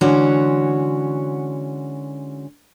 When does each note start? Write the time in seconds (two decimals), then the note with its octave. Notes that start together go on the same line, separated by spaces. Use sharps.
0.01 D3 E3 G#3 C#4 F#4 C#5